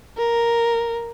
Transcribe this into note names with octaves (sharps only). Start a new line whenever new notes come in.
A#4